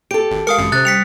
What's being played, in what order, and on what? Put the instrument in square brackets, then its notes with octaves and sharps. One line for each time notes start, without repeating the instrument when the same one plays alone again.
[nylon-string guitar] G4 A4 [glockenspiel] D7
[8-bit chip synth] G#1
[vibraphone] G#3 [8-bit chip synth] A#4 F5 [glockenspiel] D#6 C#7
[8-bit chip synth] G#1 F#2
[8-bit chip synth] C3 [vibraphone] C#4 C5 [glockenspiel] F#6 A6
[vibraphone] G3 [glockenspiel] B6 C#7 F7